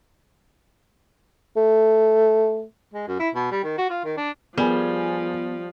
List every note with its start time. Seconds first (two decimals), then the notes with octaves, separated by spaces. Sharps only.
1.56 A3
2.94 G#3
3.08 F#2
3.19 E4
3.35 B2
3.51 G3
3.64 D#3
3.78 F#4
3.90 F4
4.04 D#3
4.17 D4
4.58 F3 G3 B3 G#4 A#4 G#5